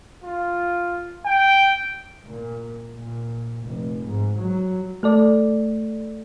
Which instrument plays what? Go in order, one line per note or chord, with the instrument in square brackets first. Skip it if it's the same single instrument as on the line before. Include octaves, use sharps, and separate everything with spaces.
[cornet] F4
G5
[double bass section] A#2
A#2
F1
G#2
F#3
[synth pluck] A3 A4 D5